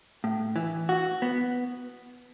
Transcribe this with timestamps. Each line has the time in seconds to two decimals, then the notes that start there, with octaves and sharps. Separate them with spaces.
0.24 A2
0.56 E3
0.89 F#4
1.22 B3